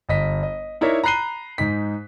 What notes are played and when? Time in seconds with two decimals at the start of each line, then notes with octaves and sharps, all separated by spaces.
0.09 G1 D#5 B6
0.43 D#5
0.81 D#4 E4 A#4 C#5 D5 E5
1.04 A#5 B5 F#6 C7 D#7 G7
1.58 G#2 D#4 B6